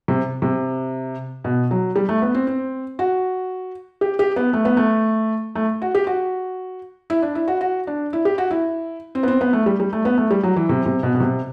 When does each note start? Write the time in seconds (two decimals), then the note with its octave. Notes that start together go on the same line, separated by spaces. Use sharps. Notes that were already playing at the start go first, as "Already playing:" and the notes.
0.08 C3
0.42 C3
1.44 B2
1.71 F#3
1.96 G3
2.09 A3
2.22 B3
2.34 C4
2.47 C4
2.99 F#4
4.01 G4
4.19 G4
4.36 B3
4.53 A3
4.65 B3
4.77 A3
5.55 A3
5.82 F#4
5.95 G4
6.07 F#4
7.10 E4
7.22 D4
7.35 E4
7.48 F#4
7.61 F#4
7.87 D4
8.13 E4
8.25 G4
8.38 F#4
8.51 E4
9.15 C4
9.23 B3
9.28 C4
9.41 B3
9.53 A3
9.66 G3
9.80 G3
9.93 A3
10.05 B3
10.18 A3
10.31 G3
10.44 F#3
10.56 E3
10.69 C3
10.86 C3
11.03 B2
11.15 B2
11.20 C3